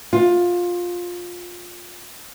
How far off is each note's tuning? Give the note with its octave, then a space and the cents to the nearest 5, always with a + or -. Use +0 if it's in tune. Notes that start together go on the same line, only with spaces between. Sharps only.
F4 +15